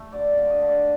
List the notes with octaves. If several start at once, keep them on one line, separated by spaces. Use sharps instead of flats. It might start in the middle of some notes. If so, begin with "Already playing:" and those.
Already playing: A3
D3 D5
F5
D3
D#5
D3
D5